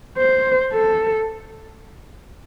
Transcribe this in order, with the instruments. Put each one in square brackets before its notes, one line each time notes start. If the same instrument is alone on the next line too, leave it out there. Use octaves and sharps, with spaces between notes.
[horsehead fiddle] C5
A4